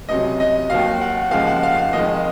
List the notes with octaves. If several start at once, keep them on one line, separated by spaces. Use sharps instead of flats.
C#2 C3 F#3 D#5
D#5
D#2 D#3 F#3 F5
F#5
D#2 C#3 F3 G#3 F5
F#5
F5
F5
F2 D#3 G#3 D#5